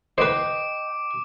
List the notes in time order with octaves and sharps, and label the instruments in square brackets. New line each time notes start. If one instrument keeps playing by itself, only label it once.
[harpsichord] B4 C5 [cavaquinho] D#5 G5 [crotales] D6 D7